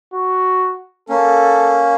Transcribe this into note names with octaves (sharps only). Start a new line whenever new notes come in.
F#4
A#3 C#4 A4